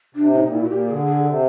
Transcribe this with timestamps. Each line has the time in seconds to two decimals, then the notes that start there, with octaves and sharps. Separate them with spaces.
0.15 C3 D4
0.29 A2 D#4
0.40 A#2
0.51 E4
0.57 A2
0.64 A#2 F#4
0.69 G4
0.88 D3 G#4
1.06 G#4
1.24 C3 A4